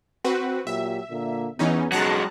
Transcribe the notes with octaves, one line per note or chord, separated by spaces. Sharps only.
C4 F#4 B4
A#2 F#3 G4 E5
A#2 D3 A#3
E2 E3 B3 C#4 D#4
B1 F2 C#3 F#3 G#3 A5 A#5 F#6